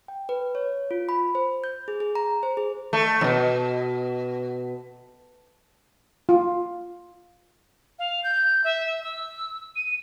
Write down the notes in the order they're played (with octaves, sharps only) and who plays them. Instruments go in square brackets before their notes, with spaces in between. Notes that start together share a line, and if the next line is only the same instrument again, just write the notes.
[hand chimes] G5
B4
C#5
F4
B5
C5
G6
G#4
G#4
A#5
C5
G#4
[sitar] A3
F2 B2
[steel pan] F4
[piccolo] F5
G6
E5
E6
D#7